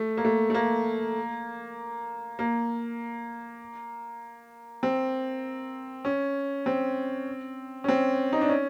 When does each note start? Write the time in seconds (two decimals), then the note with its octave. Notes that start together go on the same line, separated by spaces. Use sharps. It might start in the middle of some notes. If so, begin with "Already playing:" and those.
Already playing: A3
0.17 A#3
0.25 A3
0.50 A3
0.54 A#3
2.39 A#3
4.83 C4
6.05 C#4
6.66 C4
7.84 C#4
7.88 C4
8.33 D#4
8.41 D4
8.49 C#4